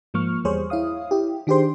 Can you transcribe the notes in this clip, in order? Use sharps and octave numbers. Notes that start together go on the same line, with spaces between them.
G#2 F3 A#3 C#6 F6
E2 G3 G#4 C5 C#5 C#6
E4 C#5 F5 D#6
E4 G4
D#3 D4 G4 G#4 C5 C6